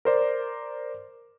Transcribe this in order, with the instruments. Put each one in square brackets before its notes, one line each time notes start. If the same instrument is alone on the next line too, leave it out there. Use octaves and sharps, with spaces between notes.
[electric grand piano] A#4 C5 D5